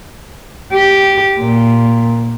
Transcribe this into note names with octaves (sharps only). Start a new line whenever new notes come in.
G4
A#2